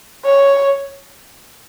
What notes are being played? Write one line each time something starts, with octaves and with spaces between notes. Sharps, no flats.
C#5